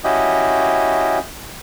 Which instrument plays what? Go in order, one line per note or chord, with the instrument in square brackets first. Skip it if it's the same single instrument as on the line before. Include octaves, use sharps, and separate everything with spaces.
[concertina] C#4 E4 F#4 G4 D#5